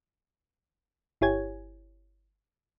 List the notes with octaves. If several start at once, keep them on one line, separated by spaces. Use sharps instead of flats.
G1 E4 G4 C#5 G#5 G#6